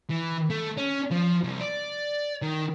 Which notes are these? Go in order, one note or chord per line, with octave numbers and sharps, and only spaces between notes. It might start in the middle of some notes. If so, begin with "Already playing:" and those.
E3
A3
C#4
F3
C2
D5
D#3